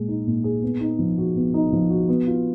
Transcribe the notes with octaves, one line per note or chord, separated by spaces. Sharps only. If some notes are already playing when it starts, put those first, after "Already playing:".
Already playing: A#2 G#3 G#4
D#4
A#2
G#4
B3
D#4
F3
F#4
B3
D#4
F3
F#4
B3
F4